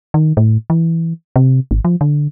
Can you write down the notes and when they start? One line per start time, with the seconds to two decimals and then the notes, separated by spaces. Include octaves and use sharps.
0.14 D#3
0.37 A2
0.70 E3
1.36 C3
1.71 G#1
1.85 F3
2.01 D3